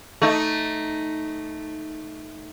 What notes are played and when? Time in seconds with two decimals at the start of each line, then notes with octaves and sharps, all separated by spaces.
0.22 A3 D#4